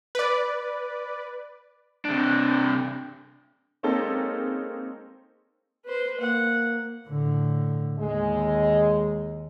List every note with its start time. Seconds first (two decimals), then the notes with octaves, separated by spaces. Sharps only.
0.15 B4 D5
2.05 C3 D4
3.83 G#3 A#3 C4 C#4 D#4 A4
5.85 B4 C5
6.20 A#3 F#5
7.08 A2 D3
7.99 D#2 G#3